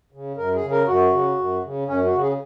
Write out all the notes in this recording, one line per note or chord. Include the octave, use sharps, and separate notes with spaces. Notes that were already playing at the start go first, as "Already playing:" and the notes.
C#3
F#2 A#4
G#4
C#3
A#4
F#2 F#4
C#3
F#2
C#3
F#2 C#4
F#4
C#3
G#4